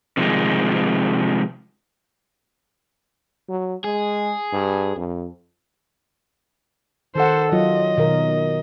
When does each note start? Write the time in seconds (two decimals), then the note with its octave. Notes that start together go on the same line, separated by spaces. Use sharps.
0.17 C3 D#3 F3 G#3
3.49 F#3
3.84 G#3 G#4
4.53 G2
4.96 F2
7.15 D#3 A4 C5 F#5
7.52 F#3 F4 D#5
7.97 B2 D#3 A#4